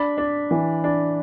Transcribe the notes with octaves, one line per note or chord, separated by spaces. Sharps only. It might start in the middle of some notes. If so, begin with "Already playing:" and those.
Already playing: D4 B5
D4
E3
D4